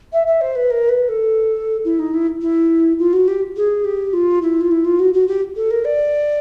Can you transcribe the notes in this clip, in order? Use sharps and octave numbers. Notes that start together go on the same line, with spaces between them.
E5
E5
C5
B4
A#4
B4
A4
E4
D#4
E4
E4
F4
F#4
G4
G#4
G4
F4
E4
F4
E4
F4
F#4
F#4
G4
A4
A#4
D5